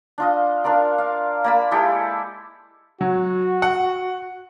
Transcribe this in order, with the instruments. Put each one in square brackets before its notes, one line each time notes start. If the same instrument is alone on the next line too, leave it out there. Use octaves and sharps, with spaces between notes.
[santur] D4 F4 D#5
D4 F4 A#4 D5
F5
A#3 D5 B5
G#3 E4 G4 A4
[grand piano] F#3 [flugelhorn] F#4
[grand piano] F#5